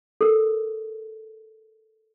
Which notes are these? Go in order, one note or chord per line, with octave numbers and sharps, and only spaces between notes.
A4 A#4